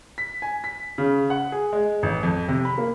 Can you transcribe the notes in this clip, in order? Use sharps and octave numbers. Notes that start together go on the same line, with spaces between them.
B6
G#5
B6
C#3
F#5
G#4
G#3
A1
F2
C3
B5
A#3